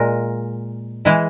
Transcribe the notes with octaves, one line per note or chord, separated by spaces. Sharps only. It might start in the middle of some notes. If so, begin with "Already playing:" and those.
Already playing: A#2 G#3 A#4
E3 G#3 E4